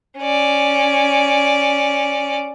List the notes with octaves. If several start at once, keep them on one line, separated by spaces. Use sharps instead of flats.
C#4 D5